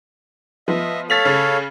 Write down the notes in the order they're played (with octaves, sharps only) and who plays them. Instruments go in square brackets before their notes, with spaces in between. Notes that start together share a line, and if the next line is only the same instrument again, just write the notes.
[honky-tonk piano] F3 B3 [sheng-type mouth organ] D#5 E5
[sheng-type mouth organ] A4 C#5 F5 [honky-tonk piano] A6 B6 F7
[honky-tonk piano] C#3